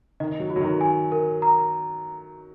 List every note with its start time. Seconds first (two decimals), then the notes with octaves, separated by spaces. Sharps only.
0.20 D#3 D#5
0.40 F#3
0.50 F#4
0.56 F#3
0.61 D#3
0.81 G#5
1.12 A#4
1.42 A#5